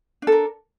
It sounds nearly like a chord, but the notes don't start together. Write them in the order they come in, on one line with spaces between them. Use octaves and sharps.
D4 A4 A#4